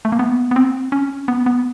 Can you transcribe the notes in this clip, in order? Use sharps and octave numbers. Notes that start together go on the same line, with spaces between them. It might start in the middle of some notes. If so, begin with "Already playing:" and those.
A3
A#3
B3
B3
C4
C#4
B3
B3